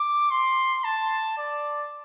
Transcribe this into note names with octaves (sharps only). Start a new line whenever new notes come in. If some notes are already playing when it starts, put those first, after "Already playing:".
Already playing: D6
C6
A5
D5